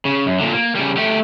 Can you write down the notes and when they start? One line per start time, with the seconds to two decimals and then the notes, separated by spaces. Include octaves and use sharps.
0.05 C#3
0.26 F#2
0.40 A#2 D3
0.53 A#3
0.75 C#3 G3
0.97 A3 G4